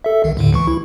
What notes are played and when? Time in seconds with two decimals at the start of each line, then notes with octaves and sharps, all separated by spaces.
0.04 A4 E5
0.24 C2 D#3
0.37 D#2 A2 D3
0.53 C#2 E3 C#6
0.67 E4